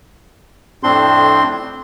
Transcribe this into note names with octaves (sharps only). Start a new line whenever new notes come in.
F2 A2 C4 D4 C6